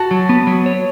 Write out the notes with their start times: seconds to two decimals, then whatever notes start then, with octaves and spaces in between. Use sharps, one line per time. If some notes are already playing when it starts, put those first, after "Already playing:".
Already playing: F#4 A5
0.11 F#3
0.29 B3
0.47 F#3
0.66 C#5